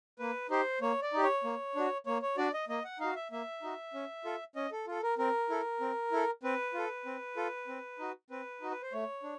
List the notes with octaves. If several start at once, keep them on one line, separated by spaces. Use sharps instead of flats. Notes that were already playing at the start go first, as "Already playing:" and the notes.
A#3 B4
D#4 G4 C5
A#3 C#5
D5
D#4 G4
C#5
A#3
D4 F#4
A#3 C#5
C#5
D4 F#4 D5
D#5
A#3 D#5
F#5
D#4 F#4 F5
E5
A#3 E5
D#4 F#4
C#4
F4 A4
C#4 D#5
A4
F4 A4
A#4
C4 A#4
E4 A4
C4
E4 A4
C4 B4
F4 A4
C4
F4 A4
C4
D#4 F#4
C4 B4
D#4 F#4
B4
C5
A3 C#5
D4